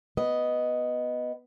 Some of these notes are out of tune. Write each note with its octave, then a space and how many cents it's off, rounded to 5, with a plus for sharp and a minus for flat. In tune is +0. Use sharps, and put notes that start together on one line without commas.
B3 +0 D#5 +0